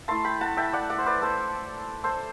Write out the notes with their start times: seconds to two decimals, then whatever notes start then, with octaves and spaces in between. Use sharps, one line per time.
0.08 A3 E4 A5 C6
0.24 G5 B5
0.41 F#5 A5
0.57 E5 G5
0.73 D5 F#5
0.90 D5 F#5
0.98 C5
1.06 B4 D5
1.22 A4 C5
2.04 A4 C5